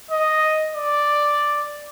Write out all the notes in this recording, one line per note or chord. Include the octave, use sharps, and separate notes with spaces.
D#5
D5